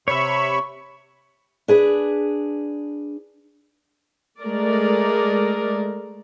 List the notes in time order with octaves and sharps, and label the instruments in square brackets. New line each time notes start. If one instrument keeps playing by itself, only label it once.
[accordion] C3 B5 C#6 [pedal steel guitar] C#5 E5
[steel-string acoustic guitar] D4 G#4 B4
[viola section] G#3 A3 A#4 D5